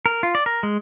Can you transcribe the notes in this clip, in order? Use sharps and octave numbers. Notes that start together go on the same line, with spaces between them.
A#4
F4
D5
A#4
G#3